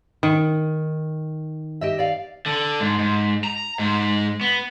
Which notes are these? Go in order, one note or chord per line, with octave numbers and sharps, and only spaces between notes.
D#3
G4 D#5 E5
D5 F5
D3
G#2
G#2
A#5
G#2
B3